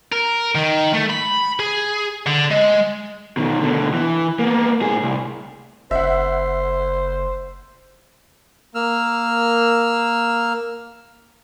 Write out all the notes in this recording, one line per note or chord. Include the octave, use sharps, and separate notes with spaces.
A#4
D#3
A3
B5
G#4
D3
G#3
B2 D#3
B2 D3
E3
A#3 B3
A2 G#4
C2
F#1 C5 E5 F#5
A#3 E6 F6